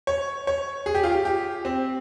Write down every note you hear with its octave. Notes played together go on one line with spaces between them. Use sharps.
C#5
C#5
G#4
G4
F4
G4
G4
C4